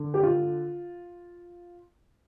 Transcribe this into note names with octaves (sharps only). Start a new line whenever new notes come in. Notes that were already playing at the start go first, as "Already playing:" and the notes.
Already playing: D3
G4
F4